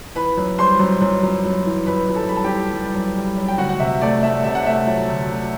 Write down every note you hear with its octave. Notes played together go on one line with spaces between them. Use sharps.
E3 B4 B5
F#2
G3 C5 C6
F#2
F#2
F#2
F#2
E3
F#2 B4 B5
F#2
A4 A5
G3 B5
A5
G4 G5
E3
G3
F#2
G3
F#2
G5
D2 F#4 F#5
F#5
C3 E5
A3 D5
A3 E5
C3 E5
F#5
A3 E5
F#3
D2
D2